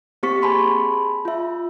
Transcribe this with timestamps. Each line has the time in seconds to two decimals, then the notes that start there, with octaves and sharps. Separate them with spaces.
0.23 A#3 C4 G4 C5 C#6 B6
0.42 G#4 G#5 A5 B5 C6
1.25 F4 E5